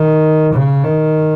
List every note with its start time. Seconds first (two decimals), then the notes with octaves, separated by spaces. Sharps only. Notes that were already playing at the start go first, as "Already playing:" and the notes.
Already playing: D#3
0.53 C#3
0.84 D#3